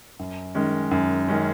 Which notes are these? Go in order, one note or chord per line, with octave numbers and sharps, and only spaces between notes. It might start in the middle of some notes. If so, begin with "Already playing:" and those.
F#2
D#3 G#3 C#4
F#2
D#3 G#3 C#4